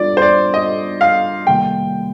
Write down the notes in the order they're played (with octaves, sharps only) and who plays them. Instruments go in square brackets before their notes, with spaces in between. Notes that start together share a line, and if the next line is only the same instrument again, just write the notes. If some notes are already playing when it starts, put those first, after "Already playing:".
Already playing: [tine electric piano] G3 D4 F4 [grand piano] D5
[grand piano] C5
D5
D#5
F5
[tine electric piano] C3 D#3 G3 A#3 [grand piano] G5